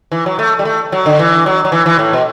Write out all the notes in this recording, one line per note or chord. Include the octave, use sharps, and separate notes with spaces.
E3
F#3
A3
G3
A3
F#3
D3
E3
F#3
F#3
E3
E3
A2
B2